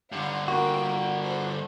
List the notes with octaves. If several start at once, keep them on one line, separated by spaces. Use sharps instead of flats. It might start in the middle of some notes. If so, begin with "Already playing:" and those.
G2 D3 F5 F#5
A#3 F#4 G5
A4 C5